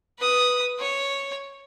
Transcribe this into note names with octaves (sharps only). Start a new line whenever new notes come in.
B4 D#6
C#5